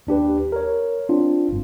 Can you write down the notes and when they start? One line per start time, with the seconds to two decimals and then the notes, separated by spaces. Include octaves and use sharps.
0.07 D#2 D4 G4 B4
0.52 A#4 C#5
1.09 C4 D4 F4
1.49 G1 G2